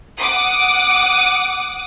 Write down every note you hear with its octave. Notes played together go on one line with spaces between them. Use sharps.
F#5 D6 D#6